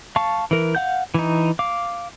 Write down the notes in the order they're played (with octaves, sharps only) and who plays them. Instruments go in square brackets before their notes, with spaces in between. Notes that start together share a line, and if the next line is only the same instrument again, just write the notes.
[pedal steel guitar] F5 A5 C#6
E3 A#4
F5 F#5 G6
E3 D#4
F5 D6